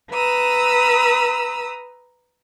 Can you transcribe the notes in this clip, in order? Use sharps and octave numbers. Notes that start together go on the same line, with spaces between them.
B4 A#5 D#6 E6